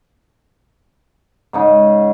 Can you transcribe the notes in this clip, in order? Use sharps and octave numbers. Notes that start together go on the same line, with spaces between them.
G#2 C#3 D#4